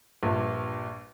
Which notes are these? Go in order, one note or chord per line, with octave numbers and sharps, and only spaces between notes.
A#1 G2 A#2